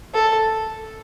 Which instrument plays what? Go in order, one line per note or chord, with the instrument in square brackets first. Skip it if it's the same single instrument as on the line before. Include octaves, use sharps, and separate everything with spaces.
[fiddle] A4